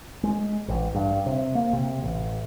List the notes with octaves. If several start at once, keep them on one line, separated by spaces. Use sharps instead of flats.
G#3
A1
G2
C3
A#3
C3
A1